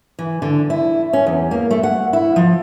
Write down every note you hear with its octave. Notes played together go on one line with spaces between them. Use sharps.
E3
D3
E4
C#4
E2
A#3
A3
F#5
E4
F3